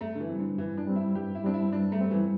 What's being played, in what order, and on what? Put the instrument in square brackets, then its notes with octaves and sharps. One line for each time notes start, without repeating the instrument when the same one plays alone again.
[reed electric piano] G2 [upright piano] A3
[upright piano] D3
E3
[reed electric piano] G3 C4
[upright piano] D3
[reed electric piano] G2 [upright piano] E3
[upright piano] D4
[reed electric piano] G3 C4
[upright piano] E4
[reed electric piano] G2 [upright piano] G4
[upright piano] E4
[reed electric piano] G3 C4 [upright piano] D4
[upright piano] E4
[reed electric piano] G2 [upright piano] D4
[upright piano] A3
[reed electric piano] G3 C4
[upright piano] E3